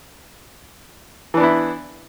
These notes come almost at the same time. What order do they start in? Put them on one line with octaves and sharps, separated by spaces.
E3 D4 B3 E4